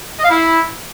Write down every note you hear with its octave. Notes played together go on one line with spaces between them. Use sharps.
D#5
F5
E4